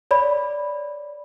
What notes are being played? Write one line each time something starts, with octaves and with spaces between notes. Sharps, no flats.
C#5 D5 B5